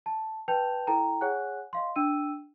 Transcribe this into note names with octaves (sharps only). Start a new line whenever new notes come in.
A5
B4 G5 A5 G6 F7
E4 A4 G5 A#5
G#4 C#5 F#5 G#5 F#6
D#5 F5 C6
D4 G5 E6 D#7